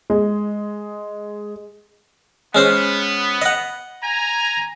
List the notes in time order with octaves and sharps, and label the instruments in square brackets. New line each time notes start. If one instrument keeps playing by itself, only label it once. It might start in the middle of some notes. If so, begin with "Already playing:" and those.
[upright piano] G#3
[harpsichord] G#3 C#4 C5 [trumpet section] B3
[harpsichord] D#5 F#5
[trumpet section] G#5 A#5